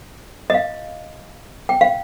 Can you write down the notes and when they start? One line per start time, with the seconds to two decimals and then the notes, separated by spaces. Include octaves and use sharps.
0.50 D#5
0.54 F5
1.69 G5
1.81 F5